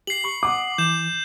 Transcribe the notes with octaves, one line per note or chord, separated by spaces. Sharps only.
G4 C7 F#7
B5 C#6
F#5 D6 D#6
E3 G6 E7